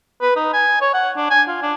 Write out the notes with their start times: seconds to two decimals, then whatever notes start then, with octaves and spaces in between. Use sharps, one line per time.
0.22 B4
0.36 D#4
0.54 G#5
0.81 C#5
0.94 F#5
1.17 D4
1.31 G#5
1.48 F4
1.62 D4